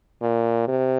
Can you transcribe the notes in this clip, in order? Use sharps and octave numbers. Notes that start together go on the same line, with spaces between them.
A#2
C3